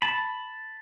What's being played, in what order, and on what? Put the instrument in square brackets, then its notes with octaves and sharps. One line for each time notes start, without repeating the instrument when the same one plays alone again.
[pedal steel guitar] A5 B5